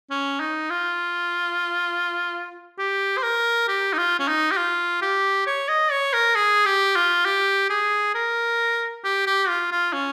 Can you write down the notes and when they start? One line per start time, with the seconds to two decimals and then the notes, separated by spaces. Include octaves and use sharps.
0.10 C#4
0.40 D#4
0.70 F4
2.79 G4
3.17 C5
3.23 A#4
3.68 G4
3.93 D#4
3.98 F4
4.19 C#4
4.28 D#4
4.52 G4
4.57 F4
5.02 G4
5.46 C#5
5.69 D#5
5.91 C#5
6.13 A#4
6.36 G#4
6.66 G4
6.96 F4
7.25 G4
7.70 G#4
8.15 A#4
9.04 G4
9.26 G4
9.49 F4
9.71 F4
9.93 C#4